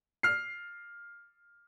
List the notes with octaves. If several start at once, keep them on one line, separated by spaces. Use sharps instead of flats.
F6 C7